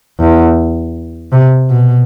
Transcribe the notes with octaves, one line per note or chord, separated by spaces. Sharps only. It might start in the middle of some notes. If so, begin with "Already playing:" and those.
E2
C3
B2